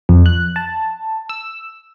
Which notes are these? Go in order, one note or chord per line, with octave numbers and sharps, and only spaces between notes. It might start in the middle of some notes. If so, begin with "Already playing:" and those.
F2
F#6
A5
E6